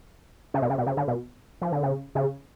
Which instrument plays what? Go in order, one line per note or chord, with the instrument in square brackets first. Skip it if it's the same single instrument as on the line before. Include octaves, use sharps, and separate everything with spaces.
[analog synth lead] C#3
B2
C#3
B2
C#3
D3
B2
F3
D3
C#3
C#3